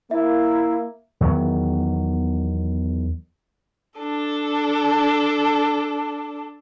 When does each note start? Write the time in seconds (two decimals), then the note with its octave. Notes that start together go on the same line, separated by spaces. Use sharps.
0.11 A#3 E4 E5
1.20 E2 D#3 F#3 B3
3.99 D4 A4